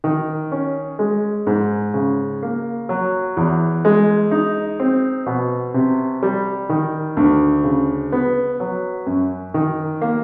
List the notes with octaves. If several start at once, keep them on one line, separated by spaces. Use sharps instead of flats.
D#3
C#4
G#3
G#2
C#3
A#3
F#3
E2
G#3
D#4
C4
B2
C3
G3
D#3
D2
C#3
B3
F#3
F#2
D#3
A#3